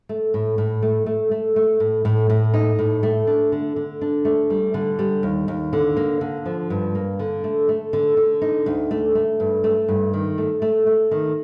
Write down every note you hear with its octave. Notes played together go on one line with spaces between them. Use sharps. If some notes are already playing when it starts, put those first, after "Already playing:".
A3
A2
A2
A3
A3
A3
A3
A2
A2
A2
D#4
A2
A3
D4
D3
D3
D4
A3
G3
D3
G3
D#2
D#2
D3
A#3
D3
F3
G2
A#3
D3
A3
A3
D3
D3
D#4
D2
A3
A3
G2
A3
G2
D#3
A3
A3
A3
D#3